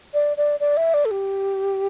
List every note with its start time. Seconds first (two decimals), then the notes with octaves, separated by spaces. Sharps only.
0.14 D5
0.37 D5
0.60 D5
0.77 E5
0.94 D5
1.05 A4
1.11 G4